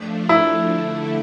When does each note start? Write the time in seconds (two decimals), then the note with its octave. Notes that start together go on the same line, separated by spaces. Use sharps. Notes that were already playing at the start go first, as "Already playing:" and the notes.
Already playing: F3 A3 D4
0.29 E4
0.70 D3 A3 E4